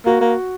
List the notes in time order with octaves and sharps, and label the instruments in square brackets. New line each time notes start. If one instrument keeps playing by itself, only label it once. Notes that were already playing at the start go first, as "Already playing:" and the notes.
[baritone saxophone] A#3 [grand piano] F#4
[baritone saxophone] A#3